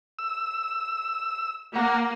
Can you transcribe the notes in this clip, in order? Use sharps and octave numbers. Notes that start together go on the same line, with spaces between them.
E6
A#3 F#5 A#5